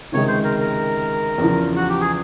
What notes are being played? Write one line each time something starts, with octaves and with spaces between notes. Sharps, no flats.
C#2 C3 D#3 G#3 C#5
C5
A#4
A#4
E2 C#3 F3
F#4
G4
G#4